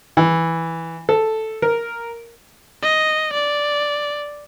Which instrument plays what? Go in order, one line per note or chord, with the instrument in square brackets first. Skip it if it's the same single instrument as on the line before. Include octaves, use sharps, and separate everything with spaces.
[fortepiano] E3
A4
A#4
[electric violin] D#5
D5